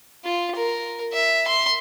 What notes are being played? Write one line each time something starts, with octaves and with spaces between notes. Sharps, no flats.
F4
A#4
E5
C6